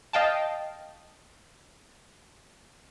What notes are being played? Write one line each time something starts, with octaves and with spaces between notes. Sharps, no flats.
D#5 F5 G5 A5